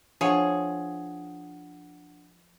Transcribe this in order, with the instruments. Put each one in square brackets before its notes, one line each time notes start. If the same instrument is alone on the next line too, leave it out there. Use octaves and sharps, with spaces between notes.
[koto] F3 C#5 [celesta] D4 F#5 [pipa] G#4